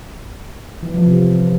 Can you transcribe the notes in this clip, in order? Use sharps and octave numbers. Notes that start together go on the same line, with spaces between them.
E3
F3
C3